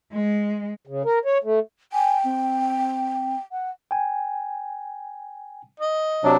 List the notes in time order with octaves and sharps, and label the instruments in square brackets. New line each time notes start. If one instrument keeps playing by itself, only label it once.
[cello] G#3
[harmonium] C#3
A#4
C#5
A3
[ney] G5 [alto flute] G#5
[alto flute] C4
F#5
[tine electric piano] G5 G#5
[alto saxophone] D#5
[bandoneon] C3 F#3 D4